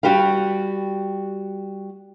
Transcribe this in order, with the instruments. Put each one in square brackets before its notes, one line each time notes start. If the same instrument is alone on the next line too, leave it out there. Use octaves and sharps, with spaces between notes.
[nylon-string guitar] G3 F#4 G4 B4 F5